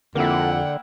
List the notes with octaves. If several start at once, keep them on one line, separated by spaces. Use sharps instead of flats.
F2 D3 A#3 E4 F#5 G5